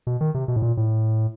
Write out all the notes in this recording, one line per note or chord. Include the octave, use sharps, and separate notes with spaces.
B2
D#3
C3
B2
A2
A#2
A2